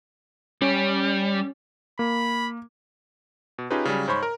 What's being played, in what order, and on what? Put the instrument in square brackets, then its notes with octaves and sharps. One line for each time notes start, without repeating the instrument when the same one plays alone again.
[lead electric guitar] G3 [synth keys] C#4
[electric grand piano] A#3 [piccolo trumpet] B5
[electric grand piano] B2
C#4 D#4 F4 G4 G#4 B4
C#3 F#3 G3
G#2 C5 C#5 B5 C#6
A#4